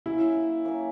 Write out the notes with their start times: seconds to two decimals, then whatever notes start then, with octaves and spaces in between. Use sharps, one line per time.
0.06 F#3 A#3 C#4 E4 F#4
0.65 F#3 A#3 C#4 F#4